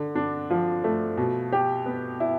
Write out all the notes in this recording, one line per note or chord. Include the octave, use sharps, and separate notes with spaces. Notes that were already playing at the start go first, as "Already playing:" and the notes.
Already playing: D3
D4
F3
A3
B2
G4
B3
E4